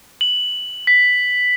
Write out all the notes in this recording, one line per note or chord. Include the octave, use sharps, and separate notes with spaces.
F#7
B6